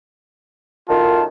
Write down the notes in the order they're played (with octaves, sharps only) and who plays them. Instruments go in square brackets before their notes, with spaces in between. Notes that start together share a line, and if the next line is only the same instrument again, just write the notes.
[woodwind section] F#2 A2 D#3 [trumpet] F4 [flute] A5